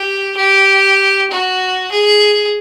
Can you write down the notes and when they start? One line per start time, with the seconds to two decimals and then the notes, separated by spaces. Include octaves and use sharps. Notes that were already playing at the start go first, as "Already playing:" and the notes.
Already playing: G4
0.36 G4
1.30 F#4
1.91 G#4